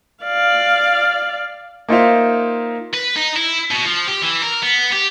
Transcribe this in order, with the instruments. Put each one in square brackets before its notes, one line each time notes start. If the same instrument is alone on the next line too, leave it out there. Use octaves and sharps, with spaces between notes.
[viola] D5 F5
[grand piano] A#3 D#4 F4 C5 E5 F5
[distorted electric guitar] B4
D#4
E4
B2
F3
G4
E3
A#4
B3
G4